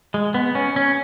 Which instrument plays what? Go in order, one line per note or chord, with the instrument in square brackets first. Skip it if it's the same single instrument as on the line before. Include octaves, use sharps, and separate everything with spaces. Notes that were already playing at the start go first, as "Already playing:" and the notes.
[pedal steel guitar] G#3
B3
C#4
C#4